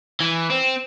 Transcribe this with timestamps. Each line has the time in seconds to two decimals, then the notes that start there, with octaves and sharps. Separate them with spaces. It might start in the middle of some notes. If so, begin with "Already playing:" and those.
0.20 E3
0.50 C4